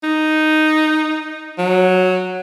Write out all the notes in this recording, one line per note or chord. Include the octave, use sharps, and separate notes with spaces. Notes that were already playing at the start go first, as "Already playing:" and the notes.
D#4
F#3